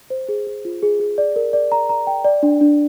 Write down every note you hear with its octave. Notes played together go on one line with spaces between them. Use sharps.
C5
G#4
G#4
F4
G#4
G#4
D5
A#4
D5
A#5
A#5
G5
D5
D4
D4